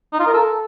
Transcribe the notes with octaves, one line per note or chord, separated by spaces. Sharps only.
D#4
F4
A#4
A4